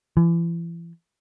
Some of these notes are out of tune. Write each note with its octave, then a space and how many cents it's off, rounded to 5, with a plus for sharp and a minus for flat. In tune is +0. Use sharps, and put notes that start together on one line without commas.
E3 +40